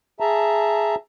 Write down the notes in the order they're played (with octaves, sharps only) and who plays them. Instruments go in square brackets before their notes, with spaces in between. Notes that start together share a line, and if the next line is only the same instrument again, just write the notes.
[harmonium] G#4 E5 A5 A#5